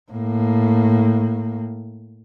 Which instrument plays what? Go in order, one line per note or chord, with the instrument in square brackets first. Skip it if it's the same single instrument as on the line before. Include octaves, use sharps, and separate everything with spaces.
[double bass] A2 A#3